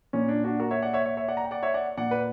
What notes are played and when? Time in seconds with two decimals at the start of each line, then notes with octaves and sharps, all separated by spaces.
0.13 A#2 C#4
0.29 D4
0.44 D4 F#4
0.60 F#4 A#4
0.71 C#5 E5
0.82 D5 F#5
0.93 C#5 E5
1.05 C#5 E5
1.17 C#5 E5
1.28 D5 F#5
1.37 A#5
1.44 G5
1.51 D5 F#5
1.63 C#5 E5
1.74 D5 F#5
1.97 A#2 D5 F#5
2.11 B4